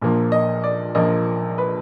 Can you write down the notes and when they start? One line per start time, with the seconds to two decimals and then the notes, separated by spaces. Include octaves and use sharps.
0.02 A#1 A#2 F3 A#3
0.32 D#5
0.64 D5
0.95 A#1 A#2 F3 A#3 D#5
1.58 B4